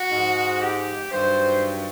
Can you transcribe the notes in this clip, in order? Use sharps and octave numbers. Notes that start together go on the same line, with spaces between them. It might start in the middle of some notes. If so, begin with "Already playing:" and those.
Already playing: F#4
G#2 F3
G4
G2 D#3 F#3 C5